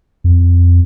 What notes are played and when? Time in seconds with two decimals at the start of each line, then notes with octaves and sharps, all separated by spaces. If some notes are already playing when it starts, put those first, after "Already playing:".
0.24 F2